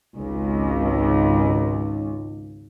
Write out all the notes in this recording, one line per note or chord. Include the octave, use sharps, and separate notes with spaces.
G#1 C#2